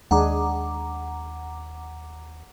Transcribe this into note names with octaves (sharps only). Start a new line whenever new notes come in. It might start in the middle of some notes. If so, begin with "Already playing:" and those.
D#2 G#3 D4 G#4 F#5 A#5 D6